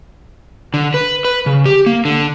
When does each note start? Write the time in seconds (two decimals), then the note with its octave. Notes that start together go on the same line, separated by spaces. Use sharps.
0.74 D3
0.94 B4
1.25 B4
1.46 C#3
1.66 G4
1.86 A#3
2.05 D3